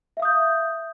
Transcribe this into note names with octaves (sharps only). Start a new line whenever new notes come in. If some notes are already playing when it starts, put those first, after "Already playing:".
E5 F5 D#6 G6